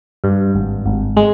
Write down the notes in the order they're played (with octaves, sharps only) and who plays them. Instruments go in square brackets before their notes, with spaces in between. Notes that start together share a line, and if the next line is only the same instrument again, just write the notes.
[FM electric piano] G2
G#1
G#1
G#3